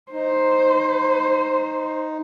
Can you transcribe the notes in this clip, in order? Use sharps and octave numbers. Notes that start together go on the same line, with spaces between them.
D#4 C5